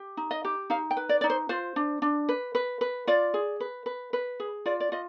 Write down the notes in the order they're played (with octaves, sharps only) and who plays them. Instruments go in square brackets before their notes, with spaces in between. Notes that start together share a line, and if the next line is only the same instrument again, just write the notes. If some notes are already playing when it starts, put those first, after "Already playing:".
Already playing: [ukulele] G4
D#4
D#5
G4
D#4 F5
G5
B4
D5
D#4 D5
C5
F4 C5
D4
D4
B4
B4
B4
F4 D5
G#4
B4
B4
B4
G#4
F4 D5
D5
F4 D#5